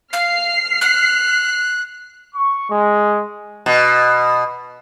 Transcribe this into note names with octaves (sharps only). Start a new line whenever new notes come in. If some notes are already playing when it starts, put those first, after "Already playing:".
F5 F6 C7
F#6
C#6
G#3
B2